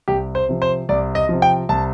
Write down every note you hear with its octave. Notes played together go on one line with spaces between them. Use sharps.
C2 G4
C5
C3 F3
C5
C2 D5
D#5
C3 F3
G5
C2 A5